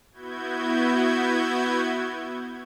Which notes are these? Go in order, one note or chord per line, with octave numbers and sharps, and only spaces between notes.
B3 E4 F#4 G6 G#6